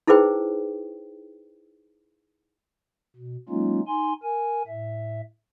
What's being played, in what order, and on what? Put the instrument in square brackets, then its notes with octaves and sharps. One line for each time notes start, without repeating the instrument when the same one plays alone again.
[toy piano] D#4 E4 G#4 B4 C5 G5
[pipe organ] B2
F#3 G#3 A#3 C#4 D#4 F4
D#4 G#5 C6
A#4 G#5
A2 E5